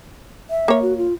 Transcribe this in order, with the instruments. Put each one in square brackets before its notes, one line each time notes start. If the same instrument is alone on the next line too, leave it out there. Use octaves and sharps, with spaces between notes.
[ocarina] E5
[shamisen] A#3 C#5
[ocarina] F#4
F4